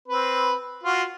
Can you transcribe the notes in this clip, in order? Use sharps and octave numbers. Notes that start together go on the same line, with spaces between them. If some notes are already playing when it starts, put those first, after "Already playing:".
C4 B4
F4 F#4